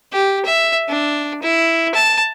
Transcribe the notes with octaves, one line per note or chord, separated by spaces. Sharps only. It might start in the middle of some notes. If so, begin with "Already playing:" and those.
G4
E5
D4
E4
A5